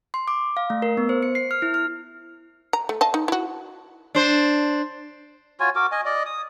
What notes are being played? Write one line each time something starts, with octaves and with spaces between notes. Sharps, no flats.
C6
D6
F5
A3
A#4
B3
C5
C#7
C7
F6
E4
F6
A#5
A3
D#5 F5 A5
D#4
E4 F#4
D4 C5
F4 F#4 C#5 G#5
F#4 A#4 D6
D#5 G#5
D5 D#5
D#6